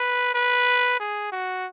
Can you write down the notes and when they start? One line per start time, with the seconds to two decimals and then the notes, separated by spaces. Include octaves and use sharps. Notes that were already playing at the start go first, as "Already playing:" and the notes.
Already playing: B4
0.35 B4
1.00 G#4
1.32 F#4